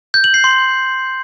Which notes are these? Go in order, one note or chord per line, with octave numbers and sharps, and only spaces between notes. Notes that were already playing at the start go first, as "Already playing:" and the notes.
G6
F#7
C7
C6